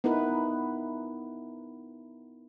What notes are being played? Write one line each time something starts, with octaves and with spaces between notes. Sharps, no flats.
B3 D#4 E4 A#4 B4